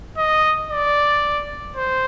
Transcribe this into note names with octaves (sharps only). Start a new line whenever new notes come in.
D#5
D5
C5